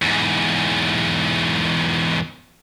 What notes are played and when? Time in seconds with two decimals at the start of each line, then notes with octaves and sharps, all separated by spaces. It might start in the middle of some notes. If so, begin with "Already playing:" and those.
0.02 E2 G#2